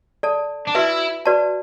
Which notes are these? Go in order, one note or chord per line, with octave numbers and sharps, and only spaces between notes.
A4 D5 A5
D4
E4 F#4 B4 E5
F#4 B4 D5 A5